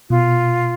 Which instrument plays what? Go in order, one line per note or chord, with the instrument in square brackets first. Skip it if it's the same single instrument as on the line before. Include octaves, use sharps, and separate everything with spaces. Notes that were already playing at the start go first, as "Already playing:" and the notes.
[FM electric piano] B2 [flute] F4